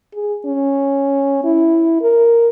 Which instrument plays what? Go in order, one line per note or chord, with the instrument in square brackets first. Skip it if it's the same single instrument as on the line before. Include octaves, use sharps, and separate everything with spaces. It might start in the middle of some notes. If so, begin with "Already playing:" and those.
[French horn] G#4
C#4
E4
A#4